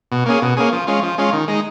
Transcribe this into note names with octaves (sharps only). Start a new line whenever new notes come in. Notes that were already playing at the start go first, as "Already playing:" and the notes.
B2
A#3 C#4 G#4
B2
A#3 C#4 G#4
F3
G#3 C#4 F4
F3
G#3 C#4 F4
D#3
G#3 D#4